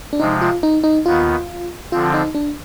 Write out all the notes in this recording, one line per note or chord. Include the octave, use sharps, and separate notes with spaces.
D4
C3 F3 G#3 D#4
F4
D#4
D#4
D#2 D#3 B3 F4
D3 F3 C4 F4
D#4
D4